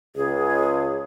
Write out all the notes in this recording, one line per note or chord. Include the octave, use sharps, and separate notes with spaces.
C#2 G#4